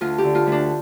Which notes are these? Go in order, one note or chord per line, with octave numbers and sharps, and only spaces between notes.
D2 F4
G4
D3
F4
D2
D4